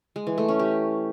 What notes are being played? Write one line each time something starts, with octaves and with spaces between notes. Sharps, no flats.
G#3
E3
A3
C#4
G4